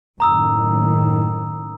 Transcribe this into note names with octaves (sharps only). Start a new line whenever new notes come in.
F#1 A2 D#3 A#5 D#6 E6